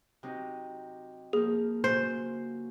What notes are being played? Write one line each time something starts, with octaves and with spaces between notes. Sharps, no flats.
C3 F#3 D#4
F3 A#3 G#4
C#3 F#3 F4 C5